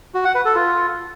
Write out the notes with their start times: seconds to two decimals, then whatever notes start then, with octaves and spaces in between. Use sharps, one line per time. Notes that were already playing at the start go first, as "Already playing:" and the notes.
0.14 F#4
0.25 F#5
0.35 B4
0.45 A4
0.55 F4